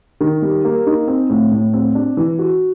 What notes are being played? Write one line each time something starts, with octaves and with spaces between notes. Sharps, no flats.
D#3
G3
A#3
D#4
C4
A2
A2
C4
D4
E3
F#4